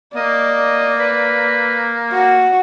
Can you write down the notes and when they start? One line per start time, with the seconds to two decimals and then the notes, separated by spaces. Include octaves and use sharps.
0.16 A#3 D5 D#5
1.00 B4
2.12 F#4